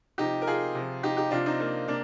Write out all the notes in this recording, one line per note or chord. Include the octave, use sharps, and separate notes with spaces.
C3 F3 D#4 G4
A#4
F4 G#4
C3 F3
D#4 G4
D#4 G4
C3 F3 D4 F4
C4 D#4
A#3
C3 A#3 D4